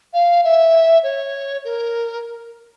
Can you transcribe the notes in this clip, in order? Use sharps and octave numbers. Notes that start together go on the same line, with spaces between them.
F5
E5
C#5
A#4